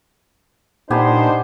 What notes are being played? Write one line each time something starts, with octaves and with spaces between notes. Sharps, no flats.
A#2 B3 D4 D#4 G4 C5 G#5